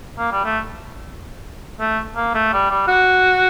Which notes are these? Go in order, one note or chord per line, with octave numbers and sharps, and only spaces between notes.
A#3
G3
A3
A3
A#3
A3
G3
G3
F#4